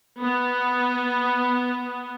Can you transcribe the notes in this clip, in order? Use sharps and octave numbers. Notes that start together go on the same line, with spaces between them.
B3